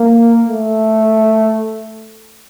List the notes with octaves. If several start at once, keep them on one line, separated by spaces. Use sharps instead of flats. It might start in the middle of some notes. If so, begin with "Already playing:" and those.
Already playing: A#3
A3